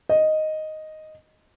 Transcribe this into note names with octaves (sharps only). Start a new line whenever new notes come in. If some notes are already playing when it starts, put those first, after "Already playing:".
D#5